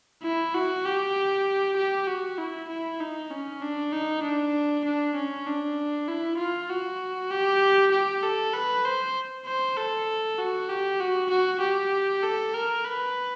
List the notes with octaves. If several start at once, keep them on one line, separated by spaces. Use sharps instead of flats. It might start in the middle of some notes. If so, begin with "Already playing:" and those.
E4
F#4
G4
G4
F#4
E4
E4
D#4
C#4
D4
D#4
D4
D4
C#4
D4
E4
F4
F#4
G4
G4
A4
B4
C5
C5
A4
F#4
G4
F#4
F#4
G4
A4
A#4
B4